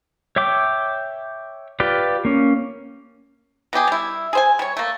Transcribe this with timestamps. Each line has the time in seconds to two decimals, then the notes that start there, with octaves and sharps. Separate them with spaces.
0.36 C#5 E5 G5 D6
1.80 F4 G4 B4 D5
2.25 A#3 C#4
3.73 B2 B3 G4 G#4
3.87 G3 E4
4.33 G#4 C5 G#5
4.59 G3 C#5
4.77 A3 A#3